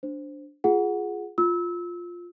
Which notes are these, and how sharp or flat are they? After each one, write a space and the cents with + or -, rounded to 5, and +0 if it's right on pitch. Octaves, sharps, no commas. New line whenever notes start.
D4 -5 C5 +0
F4 +0 G#4 +0 F#5 -10
F4 +5 E6 -25